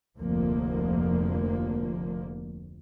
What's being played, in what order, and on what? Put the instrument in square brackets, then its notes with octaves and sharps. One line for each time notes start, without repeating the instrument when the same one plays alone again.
[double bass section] F1 D2 F3 A#3